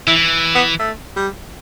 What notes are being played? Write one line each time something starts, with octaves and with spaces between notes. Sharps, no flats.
E3 E4
B3
A3
G3